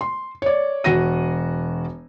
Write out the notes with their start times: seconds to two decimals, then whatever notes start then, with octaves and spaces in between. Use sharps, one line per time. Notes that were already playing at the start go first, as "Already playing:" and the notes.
0.01 C6
0.42 C#5 D5
0.84 E1 F#4 A#6 D#7